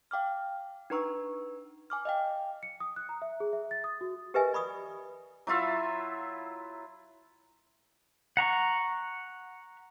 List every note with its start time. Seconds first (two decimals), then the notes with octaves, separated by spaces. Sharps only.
0.11 F5 G5 D6 F6
0.90 D4 D#4 B4 A#5 C#6 E6
1.90 G#5 D6 F6
2.05 D#5 F5 G5
2.63 C#7
2.80 D#6
2.96 F#6
3.09 A#5
3.22 E5
3.40 G#4
3.53 E5
3.71 A6
3.84 D#6
4.01 F#4
4.34 G4 A#4 B4 D#5 E5 G#5
4.53 D5 B5 C#6 D#6
5.47 F#3 E4 F4 E5
8.37 F#5 A#5 C#6